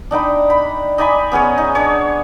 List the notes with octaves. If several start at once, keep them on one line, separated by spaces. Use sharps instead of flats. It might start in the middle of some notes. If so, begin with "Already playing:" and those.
D4 D#4 G5 B5
B5
D#4 D5 G#5 B5
B3 C#4 G#4 C#5
D#4
D4 C#5